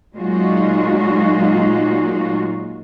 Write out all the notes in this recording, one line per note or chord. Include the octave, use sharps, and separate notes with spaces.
A#2 F#3 G#3 D#4 F4 F#4